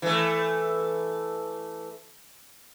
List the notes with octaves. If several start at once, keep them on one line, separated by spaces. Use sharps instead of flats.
E3 A3